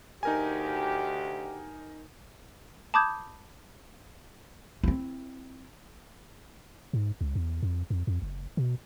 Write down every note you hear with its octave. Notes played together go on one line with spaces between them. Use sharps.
D2 D#4 F#4 G4 A#4 G#5
A5 B5 D6 D#6 G6 G#6
C4 E4
G#2
C#2
E2
F2
F2
F2
F#1
B2